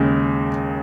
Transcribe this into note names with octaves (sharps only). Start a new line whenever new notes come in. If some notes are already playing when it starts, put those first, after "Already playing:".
Already playing: D#2 C#3 G#3